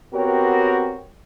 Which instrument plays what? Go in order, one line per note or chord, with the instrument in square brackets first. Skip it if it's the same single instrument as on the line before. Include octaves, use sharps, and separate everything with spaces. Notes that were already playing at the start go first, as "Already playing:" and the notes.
[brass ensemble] B3 C4 F#4 G4 A#4 C#5